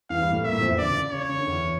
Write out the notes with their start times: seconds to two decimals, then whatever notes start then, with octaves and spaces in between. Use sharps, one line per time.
0.10 E2 E3 F5
0.21 G2 G3
0.32 A2 A3
0.44 A#2 A#3 E5
0.52 A2 A3
0.61 F2 F3
0.69 E2 E3
0.78 D3 D5
0.89 C#3
1.12 C#3 C#5
1.29 C#3
1.38 D3
1.46 E2 E3